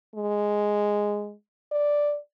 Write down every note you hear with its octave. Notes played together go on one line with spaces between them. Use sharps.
G#3
D5